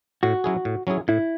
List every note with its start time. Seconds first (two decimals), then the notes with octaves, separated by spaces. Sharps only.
0.23 A2 F#4
0.44 F#3 C#4 E4 G#4
0.65 A2
0.87 F#3 C#4 E4 G#4
1.08 A2 E4